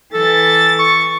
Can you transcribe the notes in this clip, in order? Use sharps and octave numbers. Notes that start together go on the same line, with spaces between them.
E3 A4 A6
C#6